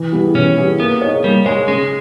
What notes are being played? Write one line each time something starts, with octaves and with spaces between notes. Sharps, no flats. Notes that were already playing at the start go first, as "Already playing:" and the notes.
Already playing: E3
G3 B3 E4 G#4
E3 C#4
G3 B3 E4 G#4
A#3 B3
D#4 G#4 C#5
G3 A#3
G#3 D#4 G#4 C#5
C#3 G#3